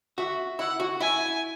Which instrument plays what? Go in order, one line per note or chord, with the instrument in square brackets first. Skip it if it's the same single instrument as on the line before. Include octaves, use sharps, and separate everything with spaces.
[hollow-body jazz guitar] F#4 [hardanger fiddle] E5
[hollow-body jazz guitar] E4 [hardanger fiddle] F#5
[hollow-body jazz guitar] F#4
[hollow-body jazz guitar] E4 [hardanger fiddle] G#5